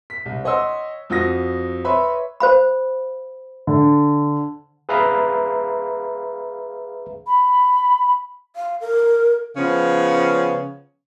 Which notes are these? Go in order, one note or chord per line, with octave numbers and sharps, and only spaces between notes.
B6
C2
C#5 D#5 F#5 G#5 C6 E6
F2 F4 F#4 D#6 A#6
B4 C#5 E5 B5 C6
C5 F5 B5
D3
G#4 B4 E5 F5 A#5
B5
F5
A#4
C#3 F3 B3 C#4